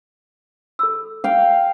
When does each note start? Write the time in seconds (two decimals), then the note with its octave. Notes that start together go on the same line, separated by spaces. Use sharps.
0.79 A4 B5 E6
1.24 F5 G5